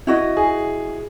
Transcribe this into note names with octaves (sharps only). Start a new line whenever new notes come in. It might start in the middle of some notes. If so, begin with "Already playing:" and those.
E4 F#4 D#5
G#4